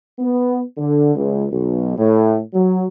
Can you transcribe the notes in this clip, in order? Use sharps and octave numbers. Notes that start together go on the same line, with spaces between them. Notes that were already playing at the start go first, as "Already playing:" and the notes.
B3
D3
C#2
B1
A2
F#3